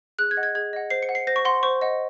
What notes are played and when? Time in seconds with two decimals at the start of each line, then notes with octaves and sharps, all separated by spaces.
0.19 G#4 F#6
0.31 G#6
0.37 D#5 F#5
0.43 G#6
0.55 G#4 G#6
0.73 D#5 F#5
0.90 C5 C7
1.02 C#7
1.09 F#5
1.15 C7
1.27 C5 A#6
1.36 C#6
1.45 F#5 C6
1.63 C5 C#6
1.81 D#5 F#5